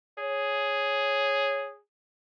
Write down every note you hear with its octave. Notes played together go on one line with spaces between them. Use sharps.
G#4 C#5